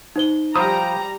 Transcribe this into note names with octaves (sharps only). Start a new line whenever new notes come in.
D#4 C5 G7
F3 G3 C5 F5 G5 A#5 B5 D#6